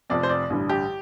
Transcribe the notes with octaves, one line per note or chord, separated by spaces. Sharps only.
F1 F2 F3 C4 D5
C5
D5
A1 G2 D3 G3
G4